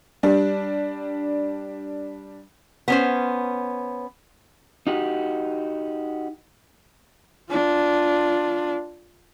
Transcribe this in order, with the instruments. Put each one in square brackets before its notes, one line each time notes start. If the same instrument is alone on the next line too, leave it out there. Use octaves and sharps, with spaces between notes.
[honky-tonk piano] G3 D4
[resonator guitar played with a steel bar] B3 C#4 C5
[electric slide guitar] D#4 F#4 G4
[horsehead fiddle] D4 F4